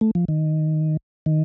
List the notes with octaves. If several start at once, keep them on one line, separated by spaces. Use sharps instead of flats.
A3
F3
D#3
D#3